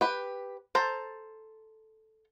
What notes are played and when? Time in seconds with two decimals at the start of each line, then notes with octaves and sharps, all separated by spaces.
0.01 G4 B4
0.75 A4 C5 A#5